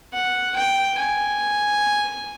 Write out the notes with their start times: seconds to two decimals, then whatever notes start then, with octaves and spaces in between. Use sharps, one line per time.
0.13 F#5
0.56 G5
0.99 G#5